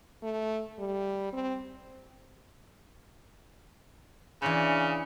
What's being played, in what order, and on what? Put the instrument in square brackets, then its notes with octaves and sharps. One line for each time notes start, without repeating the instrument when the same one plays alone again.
[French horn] A3
G3
C4
[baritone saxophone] C#3 [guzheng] E3 D4 C5